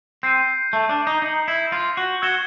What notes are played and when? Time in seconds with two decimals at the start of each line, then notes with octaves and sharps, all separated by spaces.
0.23 C4 G6 C7 D#7
0.73 A3
0.89 D4
1.07 D#4
1.22 D#4 D#6 G6 A#6 C#7 F#7
1.48 E4
1.72 F4
1.97 F#4
2.22 F#4 E6 G#6 C#7 E7 G7